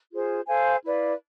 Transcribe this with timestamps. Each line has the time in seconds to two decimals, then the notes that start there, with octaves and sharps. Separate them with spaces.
0.11 F4 G#4 C5
0.47 A4 C5 F5 G#5
0.84 E4 B4 D5 F5